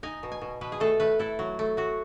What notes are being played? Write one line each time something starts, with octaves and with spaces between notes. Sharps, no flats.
D#4 G#5
B2
G#5
B2
B2 B4
G#4
A3 A4
A3 B4
E4 A4
F#3
A3
F#3 F#4